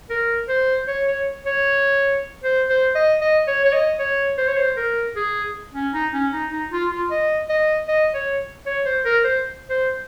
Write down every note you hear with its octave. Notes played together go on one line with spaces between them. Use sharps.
A#4
C5
C#5
C#5
C#5
C5
C5
D#5
D#5
C#5
C#5
D#5
C#5
C5
C#5
C5
A#4
G#4
C#4
D#4
C#4
D#4
D#4
F4
F4
D#5
D#5
D#5
C#5
C#5
C5
A#4
C5
C5